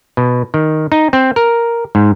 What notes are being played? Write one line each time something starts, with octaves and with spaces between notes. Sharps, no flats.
B2
D#3
D#4
C4
A#4
G#2